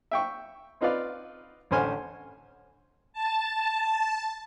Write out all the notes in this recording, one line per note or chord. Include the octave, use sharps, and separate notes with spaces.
E5 G5 C#6
C4 D#4 F4 B4 D5 F5
A1 D3 C#4 C5 G#5 F6
A5